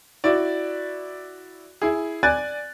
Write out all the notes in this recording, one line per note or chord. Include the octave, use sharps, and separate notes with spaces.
E4 F#4 D5
E4 G#4
D5 G#5 F#6 A6